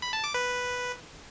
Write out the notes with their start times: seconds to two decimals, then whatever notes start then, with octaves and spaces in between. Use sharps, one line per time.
0.02 B5
0.13 A5
0.24 D6
0.34 B4